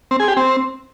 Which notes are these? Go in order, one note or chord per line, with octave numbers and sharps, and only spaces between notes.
C4
G#4
G4
C4